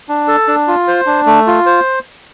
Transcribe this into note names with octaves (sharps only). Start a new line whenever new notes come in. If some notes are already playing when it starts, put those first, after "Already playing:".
D4
A4
D4
F4
C5
D4
A3
F4
C5